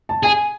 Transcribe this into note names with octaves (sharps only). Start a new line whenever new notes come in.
A5
G#4 G#5